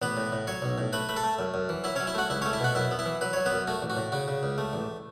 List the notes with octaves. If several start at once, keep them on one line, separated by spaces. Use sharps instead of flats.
A1 B3 B4
A2
A2
F#3 C#5 C#6
B1
A2
A3 B4 B5
A3 B5
A4 A5
A3
F#2
F#2
E3
F#3 E4 E5
C#4 C#5
F#3
E4 E5
A3 F#4 F#5
C#2 E4 E5
C#4 C#5
A3
E4 E5
B2 F#4 F#5
F#2 E4 E5
B3
E4 E5
E3
F#3 B4
F#3 C#5
B3 B4
F#2
A3 F#4
A1
F#4
A2
C#3 F#4
C#3
C#2
A3
A1